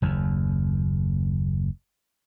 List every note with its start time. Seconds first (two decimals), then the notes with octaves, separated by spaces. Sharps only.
0.02 F#1 D#2